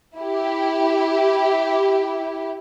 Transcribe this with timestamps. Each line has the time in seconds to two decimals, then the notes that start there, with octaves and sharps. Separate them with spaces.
0.16 E4 G4